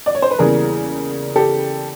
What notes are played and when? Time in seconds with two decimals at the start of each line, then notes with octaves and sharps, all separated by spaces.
0.06 D5
0.15 C#5
0.22 C5
0.31 B4
0.38 E2 C#3 E3 G3 A#3 G#4 A#4
1.36 G4 A4